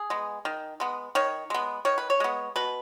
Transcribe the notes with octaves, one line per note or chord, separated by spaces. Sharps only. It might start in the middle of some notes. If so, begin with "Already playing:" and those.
Already playing: G#4
G#3 B3
D#3
G#3 B3
D#3 C#5
G#3 B3
D#3 C#5
B4
C#5
G#3 B3
B2 B4